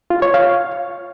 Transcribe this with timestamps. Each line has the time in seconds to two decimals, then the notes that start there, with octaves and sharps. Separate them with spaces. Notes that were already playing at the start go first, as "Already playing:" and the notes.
0.10 F4
0.22 C#5
0.34 F5